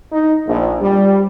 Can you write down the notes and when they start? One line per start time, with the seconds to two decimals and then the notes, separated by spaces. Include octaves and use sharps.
0.12 D#4
0.47 A#1
0.80 G3